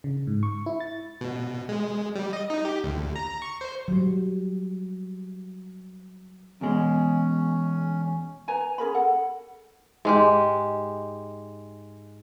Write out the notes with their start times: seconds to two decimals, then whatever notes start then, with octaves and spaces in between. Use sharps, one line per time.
0.04 C#3
0.27 G#2
0.43 C#6
0.66 E4
0.80 A6
1.21 B2
1.69 G#3
2.16 G3
2.33 D#5
2.50 D#4
2.65 G4
2.84 D2
3.16 A#5
3.42 C#6
3.61 C5
3.88 F#3 G3
6.61 E2 B2 G#3 C#4
8.48 B4 G#5 A#5
8.78 C#4 G#4 A#4 B5
8.95 A4 F#5
10.05 G#2 G#3 G4